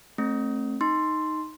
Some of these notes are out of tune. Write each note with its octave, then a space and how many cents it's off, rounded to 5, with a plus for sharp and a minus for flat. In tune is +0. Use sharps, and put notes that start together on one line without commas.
A3 +0 C4 +35
D#4 +0 C6 +0